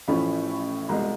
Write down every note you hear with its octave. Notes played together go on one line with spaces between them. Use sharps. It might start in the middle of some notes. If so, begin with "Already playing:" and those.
A1 A2 F3 A3 C#4 B5
C2 B2 G#3 A#5